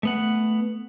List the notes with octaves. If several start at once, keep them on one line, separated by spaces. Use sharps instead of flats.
A3 B3 F#5